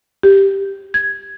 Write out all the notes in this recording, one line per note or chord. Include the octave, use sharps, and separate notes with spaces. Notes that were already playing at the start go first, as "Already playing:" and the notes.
G4
G#6